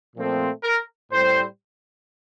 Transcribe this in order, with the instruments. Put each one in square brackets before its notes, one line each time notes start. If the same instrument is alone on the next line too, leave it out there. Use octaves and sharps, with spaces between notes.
[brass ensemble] A#2 F3 A3 C4 F4
[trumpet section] A#4
[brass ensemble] A2 G3 C4 [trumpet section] C5